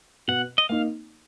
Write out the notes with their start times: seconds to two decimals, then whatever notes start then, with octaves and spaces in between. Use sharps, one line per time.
0.28 B2 F#5
0.58 D#5
0.69 A#3 D#4 F5